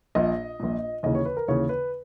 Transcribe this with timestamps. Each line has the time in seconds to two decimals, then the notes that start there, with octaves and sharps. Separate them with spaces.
0.15 A#1 A#2 D#5
0.60 A#1 A#2
1.03 D#2 C#3 E3 D#5
1.15 C#5
1.26 B4
1.37 A#4
1.48 D#2 C#3 E3 C#5
1.69 B4